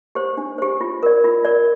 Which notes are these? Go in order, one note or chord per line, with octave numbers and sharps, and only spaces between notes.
G4 C5
D4
G4 C5
F4
A#4 D5
F4
A#4 D5